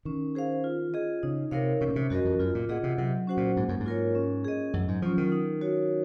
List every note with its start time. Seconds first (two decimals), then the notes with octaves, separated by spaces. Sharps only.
0.05 D#3 C#4
0.35 G#4 C5 F5
0.64 F4
0.94 G#4 D#5
1.23 C#3 D#4
1.51 C3 A#4 C#5 F5
1.81 C3 C#4
1.89 A#2
1.96 C3
2.10 F#2 F#4 A#4 D#5
2.25 F2
2.40 F#2 F4
2.55 A#2
2.69 A#2 G#4 D#5 F#5
2.83 C3
2.98 C3 F#3
3.28 C#4 F#4 C5 F#5
3.37 A#2
3.57 G#2 A#3
3.69 F#2
3.80 G#2
3.86 F4 A#4 C#5
4.15 C#4
4.45 G#4 D#5
4.74 F#2 F#3
4.88 G#2
5.02 F3 C#4 F4
5.18 D#3
5.32 D#4
5.61 F#4 C#5